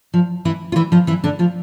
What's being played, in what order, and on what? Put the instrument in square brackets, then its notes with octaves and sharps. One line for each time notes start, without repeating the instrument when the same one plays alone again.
[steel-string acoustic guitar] F3
E3 E4
F4
E3 E4
F3 F4
E3 E4
D3 D4
F3 F4